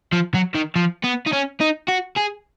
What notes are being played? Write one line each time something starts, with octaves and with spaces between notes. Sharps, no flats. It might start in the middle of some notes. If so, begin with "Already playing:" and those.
F3
F#3
D#3
F3
B3
D#4
C#4
D#4
F#4
G#4